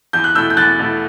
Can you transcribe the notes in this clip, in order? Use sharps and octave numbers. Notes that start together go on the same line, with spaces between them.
E2 G6
F#6
B2 A3 E4 E6 G6
G6
E2 F#6 A6
B2 A3 E4